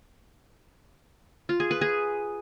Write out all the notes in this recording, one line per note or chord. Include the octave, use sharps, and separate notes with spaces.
F4
G#4
B4
G#4